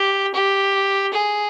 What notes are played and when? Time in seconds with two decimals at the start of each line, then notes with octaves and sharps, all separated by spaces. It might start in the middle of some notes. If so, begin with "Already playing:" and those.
Already playing: G4
0.34 G4
1.13 G#4